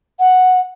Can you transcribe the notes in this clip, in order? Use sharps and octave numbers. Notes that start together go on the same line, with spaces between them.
F#5